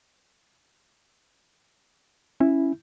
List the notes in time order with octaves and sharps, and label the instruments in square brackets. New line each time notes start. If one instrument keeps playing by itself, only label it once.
[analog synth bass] C#4 [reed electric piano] E4